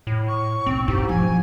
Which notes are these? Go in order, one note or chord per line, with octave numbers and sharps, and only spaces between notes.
A2
C#6
B1 C4
G#2 E4 G4
F3 E4 G#5